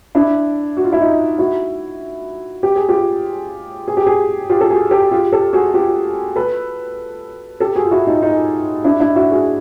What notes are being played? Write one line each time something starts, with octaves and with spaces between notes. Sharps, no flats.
D4 E4
F#4
F4
E4
D#4 F4
E4 F#4
G4
G#4
F4 G4
G#4
G4
F#4 G#4
F4 G4
A4
F#4 G#4
G4 A4
F4 G4
G4 A4
F#4 G#4
F4 G4
A4 B4
G4 A4
F#4 G#4
F4
E4 F#4
D#4 F4
D#4 F4
D4 E4
D4 E4
E4 F#4
F#4 G#4